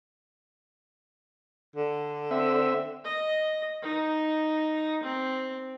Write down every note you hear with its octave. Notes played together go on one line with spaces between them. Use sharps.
D3
C4 E5
D#5
D#4
C4